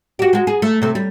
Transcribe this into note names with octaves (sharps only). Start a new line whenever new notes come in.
F#4 G4
G#3 F#4
G#4
A3
C3 A3
G3